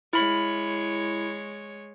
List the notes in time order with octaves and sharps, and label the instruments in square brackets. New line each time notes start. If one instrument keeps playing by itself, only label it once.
[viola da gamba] G#3 C#5 [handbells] E4 B5